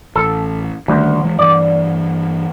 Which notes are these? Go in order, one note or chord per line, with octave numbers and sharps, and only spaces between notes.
A1 A4
D2 D#3 G3
E3 G#3
G2 E3 D5